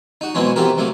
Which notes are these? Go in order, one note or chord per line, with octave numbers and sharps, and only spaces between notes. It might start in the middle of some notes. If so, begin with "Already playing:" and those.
D#4 F#4
B2 E3 F#3 G#3 C4 C#4
E3 B3 C4 G4 A#4
C3 F#3 A3 A#3